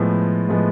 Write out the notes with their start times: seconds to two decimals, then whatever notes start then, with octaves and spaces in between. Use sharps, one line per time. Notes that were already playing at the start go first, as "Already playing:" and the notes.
Already playing: A2 F3 G#3 B3
0.49 A2 F3 G#3 B3